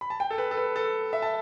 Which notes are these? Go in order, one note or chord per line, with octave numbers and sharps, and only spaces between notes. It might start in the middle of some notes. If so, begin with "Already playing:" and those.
B5
A5
G5
A4
B4
A4
B4
A4
E5
A5